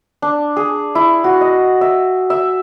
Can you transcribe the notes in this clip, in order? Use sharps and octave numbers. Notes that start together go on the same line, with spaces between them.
D4
G#4
E4
F#4
D#5
E5
E5